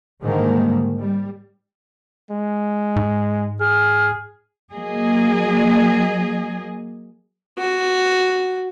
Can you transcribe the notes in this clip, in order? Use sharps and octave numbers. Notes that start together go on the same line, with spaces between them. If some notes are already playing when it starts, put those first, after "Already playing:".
G#2 D3 D#3 G3 A#3
G3
G#3
G#2
G#4 F6
F#3 A#3 G#4 D#5
F#4